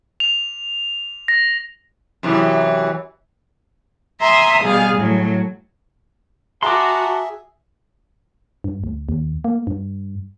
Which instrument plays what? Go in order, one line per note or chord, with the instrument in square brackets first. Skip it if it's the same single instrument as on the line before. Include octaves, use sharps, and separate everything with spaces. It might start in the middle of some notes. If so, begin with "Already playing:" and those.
[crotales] F7
A#6
[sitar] F#2 C3 E3
[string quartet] E5 G#5 A#5 C6 D#6
B2 G3 G#4 F5
A2 F#3
[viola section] F#4 [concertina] G#4 E5 [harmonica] F#5 A5 A#5 [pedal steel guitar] C6 D6
[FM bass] G2
D2
D#2
A#3
G2